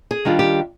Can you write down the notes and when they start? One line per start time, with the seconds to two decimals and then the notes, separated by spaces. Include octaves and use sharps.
0.11 G#4
0.25 D#3 G3 D4 F4
0.39 G4